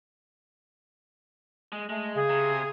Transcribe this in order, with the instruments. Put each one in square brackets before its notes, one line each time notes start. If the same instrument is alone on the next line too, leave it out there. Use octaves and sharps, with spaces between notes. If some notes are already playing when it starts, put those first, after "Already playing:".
[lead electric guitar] G#3
[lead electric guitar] G#3 [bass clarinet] A3
[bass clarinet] C#3 [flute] G#4
[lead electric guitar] C3